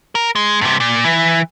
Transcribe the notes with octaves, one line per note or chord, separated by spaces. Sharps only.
A#4
G#3
G2 C3
A#2
E3